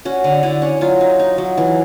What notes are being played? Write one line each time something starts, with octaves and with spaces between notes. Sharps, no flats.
C#4 F#4
D3
D3 E4
C#4
F#3 F4
D#4
D#4
F#3
E3